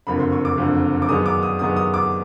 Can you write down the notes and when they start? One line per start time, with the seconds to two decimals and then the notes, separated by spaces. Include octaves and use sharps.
0.07 F#1 F2 D3 B5
0.20 C6
0.32 C#6
0.45 D6
0.57 F#1 F2 D3
1.02 D6
1.09 F#2 D#3 G#3 B3 D#6
1.26 D6
1.43 D#6
1.59 F#2 D#3 G#3 B3 D#6
1.76 D#6
1.94 D6